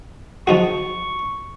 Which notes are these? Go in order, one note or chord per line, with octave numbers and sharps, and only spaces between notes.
F3 D#4 F#4 C#6